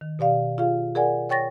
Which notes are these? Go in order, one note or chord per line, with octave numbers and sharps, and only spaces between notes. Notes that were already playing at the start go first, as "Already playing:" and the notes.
D#3
B2 G4 D5 F5
F4 G#4 F5
G#4 A#4 D5 F#5 G#5
C#5 G5 C#6 A6 A#6